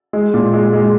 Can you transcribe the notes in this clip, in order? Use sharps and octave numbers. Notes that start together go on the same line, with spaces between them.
G#3
A#2
G#3
G#3